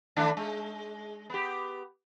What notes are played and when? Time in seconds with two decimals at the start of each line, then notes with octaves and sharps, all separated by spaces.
0.17 D#3 A3 D4
0.37 G#3
1.30 B3 G4